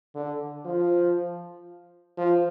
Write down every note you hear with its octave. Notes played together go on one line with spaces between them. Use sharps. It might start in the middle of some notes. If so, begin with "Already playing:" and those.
D3
F3
F3